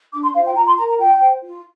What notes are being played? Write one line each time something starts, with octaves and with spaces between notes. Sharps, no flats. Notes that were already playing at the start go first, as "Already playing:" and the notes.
D4 D6
C6
F4 C5 F5
G5
F4 A#5
C6
A#4 A#5
A#5
F4 G5
C5
F4